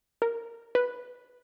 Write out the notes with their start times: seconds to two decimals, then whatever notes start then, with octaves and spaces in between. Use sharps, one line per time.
0.22 A#4
0.75 B4